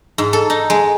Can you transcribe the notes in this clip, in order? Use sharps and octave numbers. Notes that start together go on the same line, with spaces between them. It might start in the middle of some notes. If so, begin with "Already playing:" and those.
G#2
A4
D#4
G#3